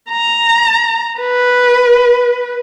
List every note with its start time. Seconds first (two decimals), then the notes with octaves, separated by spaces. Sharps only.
0.10 A#5
1.20 B4